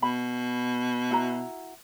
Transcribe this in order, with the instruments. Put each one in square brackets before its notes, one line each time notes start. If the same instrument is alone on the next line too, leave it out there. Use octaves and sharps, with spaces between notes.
[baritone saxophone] B2 [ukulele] B5
[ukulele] E4 F#4 A#5